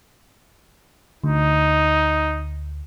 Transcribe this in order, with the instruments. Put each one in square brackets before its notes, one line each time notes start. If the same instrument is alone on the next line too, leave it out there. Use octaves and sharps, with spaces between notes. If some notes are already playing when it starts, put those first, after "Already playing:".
[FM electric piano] D2 [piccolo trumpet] D#4